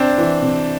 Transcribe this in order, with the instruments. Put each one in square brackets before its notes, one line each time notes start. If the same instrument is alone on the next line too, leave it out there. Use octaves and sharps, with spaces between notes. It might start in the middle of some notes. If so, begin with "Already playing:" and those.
Already playing: [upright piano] C3 [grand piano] C4 D4
[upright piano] E3
C3